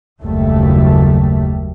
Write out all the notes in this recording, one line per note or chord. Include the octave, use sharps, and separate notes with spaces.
F#1 D#2 G3 A3